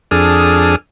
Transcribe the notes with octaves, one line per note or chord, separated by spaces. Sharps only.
F2 D4 G#4 A4 D#6 F6